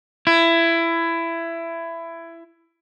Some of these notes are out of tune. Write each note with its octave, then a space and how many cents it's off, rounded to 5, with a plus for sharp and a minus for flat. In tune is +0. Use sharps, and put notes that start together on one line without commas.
E4 +20